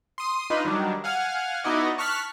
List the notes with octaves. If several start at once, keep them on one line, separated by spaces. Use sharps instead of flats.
C6 D#6
D4 D#4 F4 B4 D#5
D#3 F#3 G3 D4
F5 F#5 G#5 F6
B3 D#4 E4 F#4 D5 D#5
A5 C#6 F6 F#6 B6